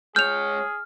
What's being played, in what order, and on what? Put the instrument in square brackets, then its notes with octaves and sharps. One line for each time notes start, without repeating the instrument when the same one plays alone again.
[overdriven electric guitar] G#3 C#5 [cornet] G#4 [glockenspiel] F6 [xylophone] G6 F7